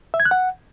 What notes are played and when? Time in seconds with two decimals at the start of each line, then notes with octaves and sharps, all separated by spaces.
0.14 E5
0.20 G#6
0.25 F#6
0.31 F#5